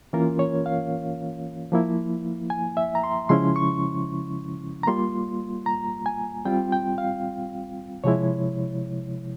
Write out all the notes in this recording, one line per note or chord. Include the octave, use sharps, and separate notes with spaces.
E3 A#3 C#4 F4 A#4
C#5
F5
F3 A#3 E4
G#5
E5
A#5
C6
C#3 F3 G#3 C#4 E4 C6
C#6
A#5
G3 A#3 F4 C6
A#5
G#5
G3 C4 F4 G5
G5
F5
C3 F3 G#3 E4 C#5